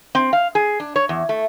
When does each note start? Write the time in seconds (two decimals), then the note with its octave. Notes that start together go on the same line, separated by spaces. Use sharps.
0.15 C4
0.33 F5
0.55 G#4
0.80 D4
0.96 C#5
1.09 E2
1.29 A3